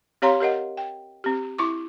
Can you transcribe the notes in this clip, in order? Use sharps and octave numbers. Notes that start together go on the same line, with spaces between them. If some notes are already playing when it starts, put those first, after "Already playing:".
C4 G4 C#5 F5 A#5 C6
G4 A#4 D#5 F#5
G5
C4 G4
E4 C#6 D6